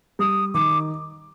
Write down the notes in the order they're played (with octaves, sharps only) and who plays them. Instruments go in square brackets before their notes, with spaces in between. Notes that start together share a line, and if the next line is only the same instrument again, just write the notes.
[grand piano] G3 [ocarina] D#6
[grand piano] D#3 [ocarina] D6